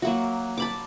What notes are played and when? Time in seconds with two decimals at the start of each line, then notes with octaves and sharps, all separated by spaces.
0.02 F#3 A#3 F#4
0.58 A5 B5 D6